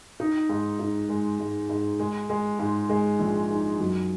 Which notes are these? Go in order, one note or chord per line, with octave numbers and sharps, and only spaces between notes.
D#4
G#2
D#4
G#3
G#2
G#2
G#3
G#3
G#2
G#3
A#1
D#4
F#2